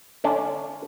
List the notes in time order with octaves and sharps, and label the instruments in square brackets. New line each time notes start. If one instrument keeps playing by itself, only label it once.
[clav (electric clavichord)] D3 C#4 D4